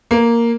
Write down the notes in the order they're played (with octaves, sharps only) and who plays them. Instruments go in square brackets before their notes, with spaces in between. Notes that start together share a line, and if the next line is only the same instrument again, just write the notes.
[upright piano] A#3